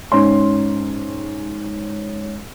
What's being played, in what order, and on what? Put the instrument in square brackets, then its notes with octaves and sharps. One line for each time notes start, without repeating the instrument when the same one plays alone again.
[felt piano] G#2 C#4 C6